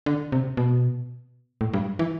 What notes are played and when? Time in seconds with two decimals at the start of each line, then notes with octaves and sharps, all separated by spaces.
0.06 D3
0.32 C3
0.57 B2
1.61 A2
1.73 G2
1.99 E3